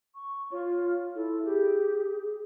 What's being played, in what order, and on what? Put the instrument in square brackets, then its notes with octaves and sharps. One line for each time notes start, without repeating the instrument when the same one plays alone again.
[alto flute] C#6
[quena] F4 [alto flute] C#5
[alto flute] E4 [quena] A4
[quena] G4 [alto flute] G#4